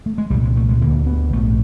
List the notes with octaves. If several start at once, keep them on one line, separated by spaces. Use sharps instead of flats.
A3
G#3
C2 A#2 G3
G#3
A3
G#3
D2 D3 A#3
B3
A#1 G#2 A3